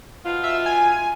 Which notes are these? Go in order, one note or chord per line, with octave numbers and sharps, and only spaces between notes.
B2 D#4 F4
E5
G#5